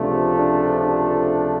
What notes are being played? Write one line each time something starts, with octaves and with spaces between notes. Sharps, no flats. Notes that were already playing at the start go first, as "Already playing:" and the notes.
Already playing: C#2 C3 F3 A3 D4
D4
D4